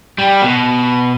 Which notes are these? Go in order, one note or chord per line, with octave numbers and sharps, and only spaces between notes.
G3
B2